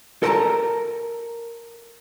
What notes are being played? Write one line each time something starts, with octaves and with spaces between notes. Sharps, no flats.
A4 A#4 C5 G5 A5 A#5